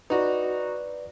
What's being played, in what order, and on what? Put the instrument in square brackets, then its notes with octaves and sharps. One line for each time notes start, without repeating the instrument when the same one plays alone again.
[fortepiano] D#4 F#4 [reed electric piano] B4 D5